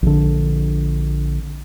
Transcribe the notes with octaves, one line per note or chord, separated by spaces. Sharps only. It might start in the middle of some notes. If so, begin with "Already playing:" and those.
A#1 D3